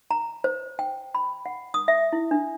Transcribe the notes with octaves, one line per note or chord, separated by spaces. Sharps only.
A#5
C5
G5
B5
F#5
D#6
E5
E4
D4